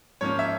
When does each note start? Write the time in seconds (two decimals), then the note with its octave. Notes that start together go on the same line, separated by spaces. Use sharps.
0.21 G#2 F3 A#3 C#4 C#5
0.39 E5